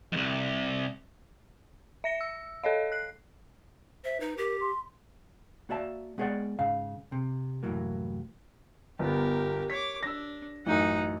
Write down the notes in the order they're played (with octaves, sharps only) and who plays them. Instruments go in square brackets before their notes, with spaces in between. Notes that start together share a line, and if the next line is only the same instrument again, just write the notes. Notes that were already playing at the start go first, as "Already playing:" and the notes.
[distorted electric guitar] C2 F2
[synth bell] E5 A#6 C#7
E6
A4 C#5 D#5 F5
F#6 C7
[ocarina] C5 [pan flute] E5
[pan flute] D#4 [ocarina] B4
[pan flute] G4 [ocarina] A#4
[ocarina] C6
[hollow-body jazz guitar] A#3 F#4 D5 E5 A5
G#3 B3 G#4 C#5 D5 F#5
G#2 C#3 F5
C3
C2 F#2 A2 E3 F#3 A#3
[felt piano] G1 B3 [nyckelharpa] G4 A#4
[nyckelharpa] C#5 D6 [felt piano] B6
[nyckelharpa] D4 [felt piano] E6 A#6
[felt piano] A1 F#2 [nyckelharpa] D#4 F#5